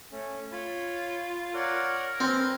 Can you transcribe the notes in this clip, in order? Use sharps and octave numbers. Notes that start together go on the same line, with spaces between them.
A3 C#4
F4 C#5 B5
A#4 C#5 D5 F#5
C4 B4 G#5